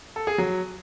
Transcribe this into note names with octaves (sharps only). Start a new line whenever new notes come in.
A4
G#4
F#3